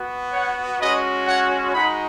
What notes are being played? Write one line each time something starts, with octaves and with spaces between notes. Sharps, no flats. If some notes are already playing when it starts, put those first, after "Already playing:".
Already playing: B3 F#4
C#5 F#5
G#3 C#4 F#4 B4 D#5
C#5 F#5
G#3 D#4 F#4 F#5 B5